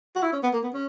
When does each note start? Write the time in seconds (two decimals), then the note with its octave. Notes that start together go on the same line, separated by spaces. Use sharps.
0.16 F#4
0.23 E4
0.33 C#4
0.43 B3
0.53 A#3
0.63 B3
0.73 C#4